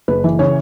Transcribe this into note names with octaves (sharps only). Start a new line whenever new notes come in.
F#1 B4
E3
C#3 C#5